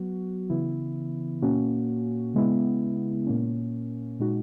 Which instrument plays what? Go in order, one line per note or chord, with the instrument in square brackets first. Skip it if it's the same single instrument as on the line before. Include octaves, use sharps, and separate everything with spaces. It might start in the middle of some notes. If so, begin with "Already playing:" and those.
Already playing: [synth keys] F#3 B3 F#4
C#3 E3 B3 E4
A#2 A#3 C#4 F#4
C#3 G#3 B3 E4
A#2 A#3 C#4
A#2 G#3 D#4 F#4